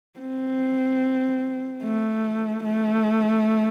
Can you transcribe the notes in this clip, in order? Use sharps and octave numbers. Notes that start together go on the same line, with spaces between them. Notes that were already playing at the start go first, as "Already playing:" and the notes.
C4
A3
A3